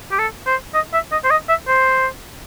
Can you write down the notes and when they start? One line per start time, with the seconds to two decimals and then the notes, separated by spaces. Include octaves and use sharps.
0.11 G4
0.19 A4
0.46 C5
0.74 D#5
0.93 E5
1.11 D#5
1.24 C5
1.30 D#5
1.49 E5
1.68 C5